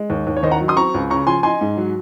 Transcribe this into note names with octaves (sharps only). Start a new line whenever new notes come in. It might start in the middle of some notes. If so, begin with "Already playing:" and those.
Already playing: G#3
D#2
D#2
C#5
D#3 C5 D#5
F#5 A#5
F#3
C6 D#6
C4 A#5 C#6
C#2
C#3 A#5 C#6
F3 G#5 C6
D#4 G#5 C6
G#2
F#3